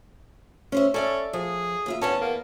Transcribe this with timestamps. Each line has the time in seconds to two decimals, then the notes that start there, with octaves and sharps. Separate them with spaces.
0.72 C#4 C5 E5
0.94 C#4 A4 D5 E5
1.33 F3 G#4
1.86 D#2 F4 E5
2.01 E2 B3 C#4 A5
2.21 A#3